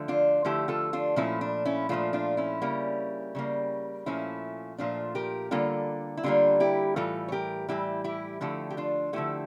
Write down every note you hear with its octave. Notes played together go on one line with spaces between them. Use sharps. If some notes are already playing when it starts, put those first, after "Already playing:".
Already playing: D3 F3 A3
D4 F4
D3 F3 A3 E4 G4
F4 A4
D4 F4
A#2 F3 A3 C#4 E4
D4
C#4 E4
A#2 F3 A3 D4 F4
D4 F4
C#4 E4
C#3 G3 A#3
C#3 G3 A#3
A#2 F3 A3 C#4 E4
A#2 F3 A3 D4 F4
G4 A#4
D3 G3 A#3 F4 A4
E4
D3 G3 A#3 D4 F4
E4 G4
A2 E3 G3 F4 A4
C#5
G4 A#4
A2 E3 G3 E4 G4
E4 G4
D3 F3 A3 E4 G4
G4
D4 F4
D3 F3 A3 E4 G4